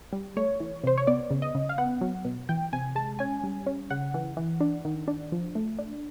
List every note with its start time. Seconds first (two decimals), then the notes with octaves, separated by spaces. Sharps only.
0.13 G3
0.37 A3 C#5
0.60 E3
0.84 C3 C5
0.98 C#5
1.07 B3 D5
1.31 C#3
1.42 D#5
1.55 C#3
1.69 F5
1.78 B3 F#5
2.01 F#3
2.25 B2
2.49 E3 G5
2.73 C3 G#5
2.95 G#3 A5
3.19 C#4 G#5
3.44 G3
3.66 C#4
3.90 C#3 F#5
4.14 E3
4.37 E3
4.60 D4
4.85 D#3
5.08 D4
5.32 F3
5.55 A3
5.79 D4